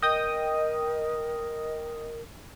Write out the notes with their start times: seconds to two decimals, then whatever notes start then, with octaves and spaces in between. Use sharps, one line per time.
0.02 A#4 D#5 G5 D#6